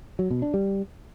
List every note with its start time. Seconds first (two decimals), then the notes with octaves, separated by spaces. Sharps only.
0.19 F#3
0.30 B2
0.42 D4
0.54 G3